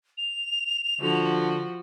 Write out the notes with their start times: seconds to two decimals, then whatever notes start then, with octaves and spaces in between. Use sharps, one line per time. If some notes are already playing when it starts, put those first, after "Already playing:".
0.18 F7
1.01 D3 F3 F#4